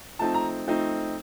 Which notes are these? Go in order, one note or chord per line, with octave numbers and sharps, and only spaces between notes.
F3 A3 C4 D#4 A5
A#5
F3 A3 C4 D#4